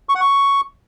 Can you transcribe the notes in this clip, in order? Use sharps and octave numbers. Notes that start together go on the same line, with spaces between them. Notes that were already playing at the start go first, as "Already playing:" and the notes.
C#6
F#5
C#6